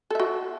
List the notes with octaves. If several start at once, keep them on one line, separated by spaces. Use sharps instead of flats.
F#4 A4 E5